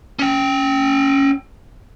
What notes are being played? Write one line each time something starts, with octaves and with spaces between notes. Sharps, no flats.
C#4 G5